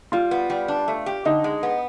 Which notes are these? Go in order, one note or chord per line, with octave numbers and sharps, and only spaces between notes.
G3 F4
B3
G3
D4
A3
G4
D3 D#4
G#3
B3